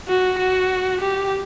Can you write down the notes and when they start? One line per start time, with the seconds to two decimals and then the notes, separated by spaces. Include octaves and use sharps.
0.08 F#4
0.39 F#4
1.01 G4